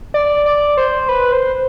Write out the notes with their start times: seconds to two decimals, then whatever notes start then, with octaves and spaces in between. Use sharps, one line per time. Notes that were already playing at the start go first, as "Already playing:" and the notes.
0.14 D5
0.46 D5
0.77 C5
1.09 B4
1.32 C5